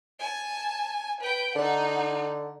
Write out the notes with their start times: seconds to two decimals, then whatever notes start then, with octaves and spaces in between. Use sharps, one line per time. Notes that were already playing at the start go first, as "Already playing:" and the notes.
0.19 G#5 A5
1.21 B4 G5
1.56 D3 D#4 F#5